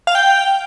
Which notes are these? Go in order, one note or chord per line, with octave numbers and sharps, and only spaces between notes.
F5
G5